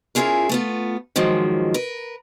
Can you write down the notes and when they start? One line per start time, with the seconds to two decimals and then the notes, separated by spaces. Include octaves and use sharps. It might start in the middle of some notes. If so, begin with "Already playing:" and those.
0.15 C#4 E4 F4 G#4 A#4
0.49 A3 B3 F4
1.16 G#2 D#3 F3 F#3 G#3
1.74 A#4 B4